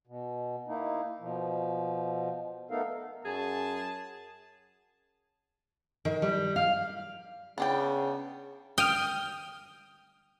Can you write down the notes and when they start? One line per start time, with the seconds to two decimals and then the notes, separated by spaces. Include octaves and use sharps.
0.07 B2
0.68 A#3 D#4 E4
1.20 B2 F3
2.71 A3 B3 D#4 A4 A#4 F5
3.25 F#2 G#4 A5
6.05 D#3
6.22 G3
6.56 F5
7.58 C#3 B3 D4 G5
8.78 G5 D#6 F6